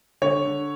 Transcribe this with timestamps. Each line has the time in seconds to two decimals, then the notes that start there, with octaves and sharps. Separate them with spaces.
0.22 D3 C#5
0.45 D3